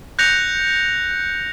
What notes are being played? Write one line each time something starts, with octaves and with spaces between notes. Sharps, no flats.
F#6 G6 A#6 C#7 F7